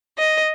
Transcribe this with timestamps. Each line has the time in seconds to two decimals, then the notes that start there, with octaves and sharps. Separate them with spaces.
0.18 D#5